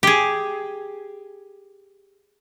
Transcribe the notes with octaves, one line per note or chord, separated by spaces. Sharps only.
G4 G#4